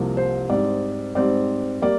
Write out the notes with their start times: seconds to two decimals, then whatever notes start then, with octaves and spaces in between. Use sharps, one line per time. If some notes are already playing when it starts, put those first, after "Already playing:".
Already playing: C2 C3 F3 A#3
0.17 C5
0.49 G#2 G3 C4 D5
1.15 G#2 G3 C4 D5
1.82 G3 A#3 D5